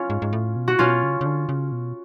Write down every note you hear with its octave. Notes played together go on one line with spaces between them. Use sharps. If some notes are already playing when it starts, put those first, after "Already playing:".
Already playing: C#4 F4
G#2
G#2
A2
B2
F#4
B2 C#4 F4
C#3
C#3
D3
C#3
B2